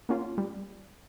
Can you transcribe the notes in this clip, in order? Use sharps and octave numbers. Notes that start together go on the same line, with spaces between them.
A#3 C#4 F4
G3